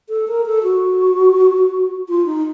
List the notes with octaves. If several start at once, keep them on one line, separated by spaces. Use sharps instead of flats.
A4
A#4
A4
F#4
F4
D#4